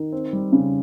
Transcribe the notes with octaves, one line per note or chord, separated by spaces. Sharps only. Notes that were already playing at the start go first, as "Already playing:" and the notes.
Already playing: D#3
C4
G3
C#3